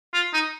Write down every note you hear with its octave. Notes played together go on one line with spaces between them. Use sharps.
F4
D#4